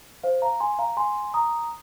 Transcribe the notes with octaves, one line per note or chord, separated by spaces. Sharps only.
C5 F5
F5 A#5
G#5 C6
F5 A#5
G#5 C6
A#5 D#6